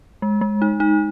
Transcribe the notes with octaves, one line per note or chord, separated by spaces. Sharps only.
G#3
G#3
D#4
D#4